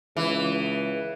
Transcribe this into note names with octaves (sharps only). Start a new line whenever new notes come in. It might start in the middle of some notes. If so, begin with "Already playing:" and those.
C#2 E3